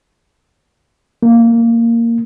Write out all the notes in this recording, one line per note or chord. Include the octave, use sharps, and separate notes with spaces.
A#3